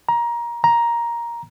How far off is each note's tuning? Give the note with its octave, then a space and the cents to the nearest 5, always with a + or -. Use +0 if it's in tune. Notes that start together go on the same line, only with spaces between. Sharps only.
A#5 +20
A#5 +10